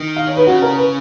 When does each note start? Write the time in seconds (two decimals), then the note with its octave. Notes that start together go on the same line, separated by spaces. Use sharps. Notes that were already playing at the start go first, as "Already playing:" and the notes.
Already playing: D#3
0.16 F5
0.27 C#5
0.37 B4
0.47 C#3 F#4
0.62 A#4
0.78 B4